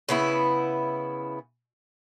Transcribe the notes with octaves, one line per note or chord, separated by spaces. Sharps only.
C#3 B3 E4